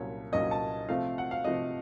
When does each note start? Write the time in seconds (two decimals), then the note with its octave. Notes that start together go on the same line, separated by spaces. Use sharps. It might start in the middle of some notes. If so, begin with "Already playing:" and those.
Already playing: C2 A#2 F#3 A#3 C#4 C#5
0.32 C2 A#2 F#3 A#3 C#4 D#5
0.51 A5
0.89 C3 F3 A3 C4 F5
1.18 F#5
1.31 F5
1.44 C3 F3 A3 C4 D#5